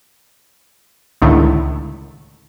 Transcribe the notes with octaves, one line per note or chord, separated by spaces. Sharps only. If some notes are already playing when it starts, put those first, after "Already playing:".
C#2 A2 D3 D#3 A3